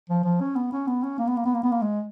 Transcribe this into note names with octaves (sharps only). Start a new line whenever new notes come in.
F3
F3
C#4
B3
C#4
B3
C#4
A#3
B3
A#3
B3
A#3
B3
A#3
G#3